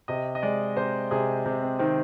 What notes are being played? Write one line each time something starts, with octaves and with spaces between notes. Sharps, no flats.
C3 D#5
D#5
G#3 D5
C3 C5
C3 G#4
C3
C4
D#3 C4